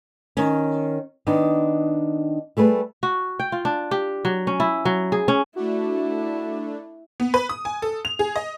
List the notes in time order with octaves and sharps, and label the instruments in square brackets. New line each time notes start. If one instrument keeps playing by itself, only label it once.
[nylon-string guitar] D#3 C#4
D#3 B3 D4 D#4
G3 A3 G#4 B4
[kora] F#4
G5
F4
D4
G4
F#3
C#4
E4
F#3
G#4
C#4
[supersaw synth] A3 D4 [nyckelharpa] E4 [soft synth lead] F#4
[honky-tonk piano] B3
B4
D#6
G#5
A4
F7
G#4
D#5